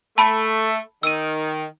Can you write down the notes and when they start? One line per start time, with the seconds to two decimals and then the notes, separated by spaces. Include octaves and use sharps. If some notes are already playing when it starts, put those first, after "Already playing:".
0.18 A3 A5 B5 D7
1.03 D#3 E6 D#7